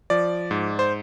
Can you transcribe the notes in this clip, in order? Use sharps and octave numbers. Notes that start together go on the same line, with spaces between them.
F3 D5
G#2
C5